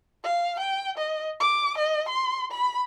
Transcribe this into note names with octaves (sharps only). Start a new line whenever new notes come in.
F5
G5
D#5
D6
D#5
C6
B5